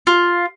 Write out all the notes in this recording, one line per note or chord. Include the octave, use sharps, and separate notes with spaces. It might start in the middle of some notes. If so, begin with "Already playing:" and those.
F4